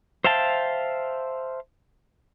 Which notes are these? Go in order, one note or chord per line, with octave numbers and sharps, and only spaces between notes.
C5 E5 F5 G5 A5